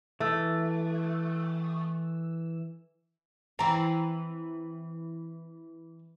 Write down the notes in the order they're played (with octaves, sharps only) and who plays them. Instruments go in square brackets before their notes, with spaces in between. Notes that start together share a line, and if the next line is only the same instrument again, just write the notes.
[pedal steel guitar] E3 E6 [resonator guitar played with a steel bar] A3
[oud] E3 C4 [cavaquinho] A#5